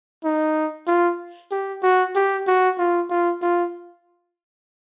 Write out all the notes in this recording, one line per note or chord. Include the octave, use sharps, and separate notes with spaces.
D#4
F4
G4
F#4
G4
F#4
F4
F4
F4